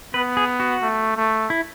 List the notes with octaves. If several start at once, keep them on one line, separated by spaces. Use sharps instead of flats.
B3 B4
G#4
F#4
A3
A3
E4